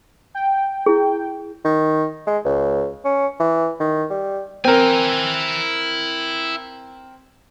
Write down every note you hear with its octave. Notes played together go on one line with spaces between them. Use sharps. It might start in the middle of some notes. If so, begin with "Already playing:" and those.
G5
E4 G#4
D#3
G#3
C#2
C#4
E3
D#3
G3
C4 E4 A#4 G#5